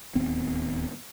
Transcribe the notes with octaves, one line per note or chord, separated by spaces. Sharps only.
D1 D#2 B3 C4